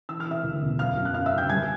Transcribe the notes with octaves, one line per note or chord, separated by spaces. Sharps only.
E3 E6
F6
C3 E5 E6
D2
E1
F#2 F5 F6
F#2
F#6
F#1 F5 F6
E5 E6
D3
G5 G6
G3 G#5 G#6